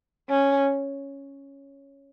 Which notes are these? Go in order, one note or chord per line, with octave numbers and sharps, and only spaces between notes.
C#4